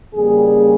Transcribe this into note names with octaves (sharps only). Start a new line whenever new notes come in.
F2 C#3 G3 A#3 G#4